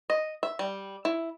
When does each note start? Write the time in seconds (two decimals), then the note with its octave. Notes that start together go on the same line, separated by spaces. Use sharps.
0.10 D#5
0.43 E5
0.59 G3
1.05 E4